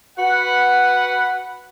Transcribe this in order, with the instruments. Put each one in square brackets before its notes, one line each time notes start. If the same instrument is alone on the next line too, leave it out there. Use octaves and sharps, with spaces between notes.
[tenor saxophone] F#4 [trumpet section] B4 F#5